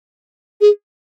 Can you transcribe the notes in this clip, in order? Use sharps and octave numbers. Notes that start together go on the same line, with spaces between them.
G#4